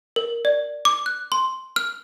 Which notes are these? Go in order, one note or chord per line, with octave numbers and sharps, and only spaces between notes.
A#4
D5
D6
F#6
C6
F6